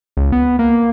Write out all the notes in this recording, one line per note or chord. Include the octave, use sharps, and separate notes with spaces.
C#2
B3
A#3